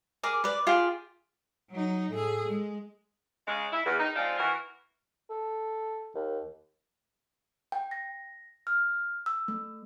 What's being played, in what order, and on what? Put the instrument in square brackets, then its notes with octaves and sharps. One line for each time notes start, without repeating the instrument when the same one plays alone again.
[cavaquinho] G#4 A#4 D6
B4 D5
F4 G4 G#4
[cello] F#3 D#4
[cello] A2 G#4 [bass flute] A4
[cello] G#3
[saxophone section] C#3 G#3
E4
E2
D#4
F3 G#3 C4 D4 D#4 F4
E3 F#4 A#4
[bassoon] A4
D#2
[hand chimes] G5
A#6
F6
E6
A3